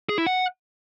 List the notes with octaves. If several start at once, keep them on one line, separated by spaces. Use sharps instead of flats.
G#4
E4
F#5